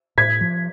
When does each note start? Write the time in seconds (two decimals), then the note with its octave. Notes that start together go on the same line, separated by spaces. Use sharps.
0.17 A2 G#6 B6
0.41 F3